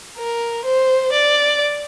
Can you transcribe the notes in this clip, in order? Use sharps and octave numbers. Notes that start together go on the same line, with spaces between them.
A#4
C5
D5